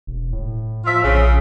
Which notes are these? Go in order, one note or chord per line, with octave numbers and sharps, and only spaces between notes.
E1
A2
F3 F4 E5
A#1 C#3